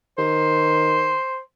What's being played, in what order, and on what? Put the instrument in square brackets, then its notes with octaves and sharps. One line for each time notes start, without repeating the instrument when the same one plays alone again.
[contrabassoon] D#3 [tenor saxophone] C5